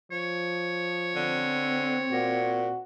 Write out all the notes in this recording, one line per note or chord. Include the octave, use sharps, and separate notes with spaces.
F3 C#5
D3 C4
A#2 F#4